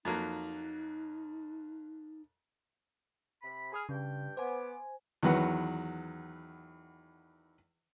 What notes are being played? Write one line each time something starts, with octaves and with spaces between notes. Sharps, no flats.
F2 F#3 A#3 D#4
C3 B5
G#4 B5 D#6 F6
G2 C#3 G5
B3 C5 G#5 D6
E2 D#3 F#3 B4 F#5